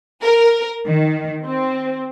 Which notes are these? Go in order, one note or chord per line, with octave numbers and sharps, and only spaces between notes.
A#4
D#3
C4